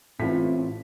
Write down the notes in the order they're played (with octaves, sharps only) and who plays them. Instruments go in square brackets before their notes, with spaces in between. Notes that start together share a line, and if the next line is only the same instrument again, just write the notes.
[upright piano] A1 F4 B6 [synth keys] A2 [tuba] C4